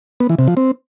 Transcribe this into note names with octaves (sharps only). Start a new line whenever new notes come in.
B3
E3
C3
F3
C4